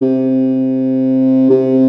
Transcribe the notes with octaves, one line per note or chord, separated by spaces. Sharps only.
C3
C3